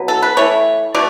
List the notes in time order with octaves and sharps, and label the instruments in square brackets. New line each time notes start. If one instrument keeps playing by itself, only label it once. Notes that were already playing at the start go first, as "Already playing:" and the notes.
Already playing: [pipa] B2 F#3 B3
A4
B4
E3 A3 C#5
B2 A3 D5